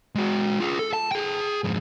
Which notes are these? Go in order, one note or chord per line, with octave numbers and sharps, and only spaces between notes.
G#3 F#4
F4 G#4
A4
A5
G#4 G5
F2 G#2